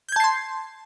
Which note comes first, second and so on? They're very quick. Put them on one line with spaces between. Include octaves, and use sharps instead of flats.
G6 G#6 A5 C7 C6